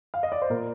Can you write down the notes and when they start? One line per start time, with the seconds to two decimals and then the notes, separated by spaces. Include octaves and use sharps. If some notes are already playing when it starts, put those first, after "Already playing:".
0.14 F5
0.23 D#5
0.32 D5
0.42 C5
0.50 A#2 A#4